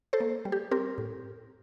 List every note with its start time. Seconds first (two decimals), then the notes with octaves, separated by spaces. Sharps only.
0.13 A4 C5
0.20 A#3
0.45 G3
0.52 G4
0.71 C4 G4 A#4
0.98 A2